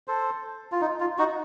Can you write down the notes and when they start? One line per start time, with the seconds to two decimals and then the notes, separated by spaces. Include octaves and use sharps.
0.08 A4 C5
0.72 F4
0.81 D#4
1.00 F4
1.18 D#4 F#4